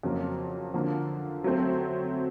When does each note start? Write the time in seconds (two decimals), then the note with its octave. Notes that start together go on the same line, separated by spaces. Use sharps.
0.03 F2 C#3 F#3 A#3
0.74 D3 F3 A#3
1.44 F#3 A3 C4